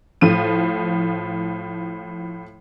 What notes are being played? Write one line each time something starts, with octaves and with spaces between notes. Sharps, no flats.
A2 F3 D#7